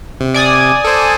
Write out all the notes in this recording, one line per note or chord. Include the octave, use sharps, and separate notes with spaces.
C3
D5 G#5 D#6
A4 C5